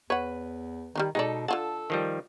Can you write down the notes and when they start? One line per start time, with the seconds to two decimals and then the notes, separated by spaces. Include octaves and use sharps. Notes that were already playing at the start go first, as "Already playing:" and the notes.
0.10 E2 B4 C#5 F#5
0.95 D#3 G3 D4 D#4
1.15 B2 G#3 D#4 G#4 A4 D5
1.48 D3 F4 A4 F#5 A5
1.90 D#3 F3 G3